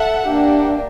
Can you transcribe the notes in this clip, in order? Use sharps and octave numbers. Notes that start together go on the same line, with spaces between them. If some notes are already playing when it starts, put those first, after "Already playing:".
Already playing: A4 E5 F#5
A#3 D4 G4